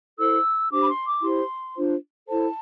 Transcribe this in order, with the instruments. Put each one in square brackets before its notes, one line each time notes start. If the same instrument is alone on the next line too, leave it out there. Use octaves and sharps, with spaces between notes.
[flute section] E4 A4 C5 E6
D4 G4 C5 D6
B5
C6
D6
E4 G4 C5 C6
D4 F4 C5
E4 A4 C5 A5